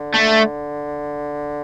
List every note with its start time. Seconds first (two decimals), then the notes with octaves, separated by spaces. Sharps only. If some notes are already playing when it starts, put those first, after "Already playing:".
Already playing: D3
0.14 A3